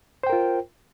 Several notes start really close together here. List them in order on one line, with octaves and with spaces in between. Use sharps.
C5 G5 A#4 F4